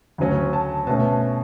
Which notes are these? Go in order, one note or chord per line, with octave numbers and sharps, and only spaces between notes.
D2 C#3 F#3 C#4
A5
B2 A3 C#4 A5